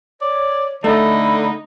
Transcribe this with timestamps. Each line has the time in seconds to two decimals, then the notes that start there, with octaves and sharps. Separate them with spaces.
0.21 C#5 D5
0.84 D3 A3 D#4 B5